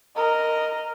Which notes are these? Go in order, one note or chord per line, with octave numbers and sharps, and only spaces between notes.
A#4 D#5